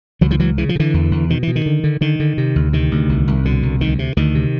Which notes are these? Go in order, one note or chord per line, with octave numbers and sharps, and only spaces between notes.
C#2 E3 F#3
D#3 F3
C#2 E3 F#3
C#3 E3
F3
C#3
D3 E3
E2
E2
B2 D#3
B2 E3
D#3
D3
D3
D3 D#3
D3
C3
D2
C3 D#3
D2
C2
C2
B2 D3
C2
D2 D#3
C3
D2 D#3
C3